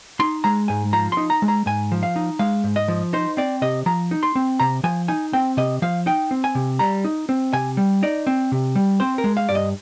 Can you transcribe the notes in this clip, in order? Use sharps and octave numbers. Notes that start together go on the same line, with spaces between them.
D#4 C6
G#3 A#5
G#2 G#5
F3 A#5
D#4 C6
A#5
G#3
A#5
G#2 G#5
F3
F5
D#4
G#3 F5
G#2
D#5
F3
D#4 C5
C4 D5
C3 D#5
F3 A#5
D#4
C6
C4
C3 A#5
F3 G#5
D#4 G#5
C4 G5
C3 D#5
F3 F5
D#4 G5
C4
G#5
C3
G3 A#5
D#4
C4
C3 G#5
G3
D#4 D5
C4
C3
G3
C4 C5
A#4
G#3
F5
G2 D5
D#5